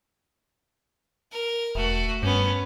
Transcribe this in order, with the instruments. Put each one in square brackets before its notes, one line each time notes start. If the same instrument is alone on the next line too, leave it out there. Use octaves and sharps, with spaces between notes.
[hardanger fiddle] A#4
[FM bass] E1 [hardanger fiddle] A3 F#4
[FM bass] G2 [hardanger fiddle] B3 C#4